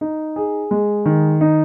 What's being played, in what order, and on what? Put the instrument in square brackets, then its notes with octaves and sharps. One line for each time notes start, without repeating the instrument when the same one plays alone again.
[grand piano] D#4
G#4
G#3
D#3
D#4